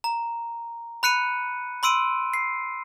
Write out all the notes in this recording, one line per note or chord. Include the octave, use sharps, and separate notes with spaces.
A#5
B5 F#6 C#7 D#7
B5 C6 E6 D7 D#7
C7